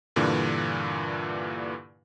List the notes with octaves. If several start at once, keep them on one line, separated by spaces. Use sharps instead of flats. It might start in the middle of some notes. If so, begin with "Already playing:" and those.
G2 A#2 D3 E3